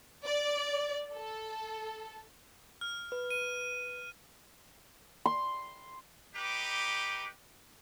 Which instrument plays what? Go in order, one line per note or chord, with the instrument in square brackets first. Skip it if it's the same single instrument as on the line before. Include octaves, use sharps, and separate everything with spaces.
[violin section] D5
A4
[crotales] F6
[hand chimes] B4
[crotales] D#7
[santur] C6
[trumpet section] D#4 G4 B4 D6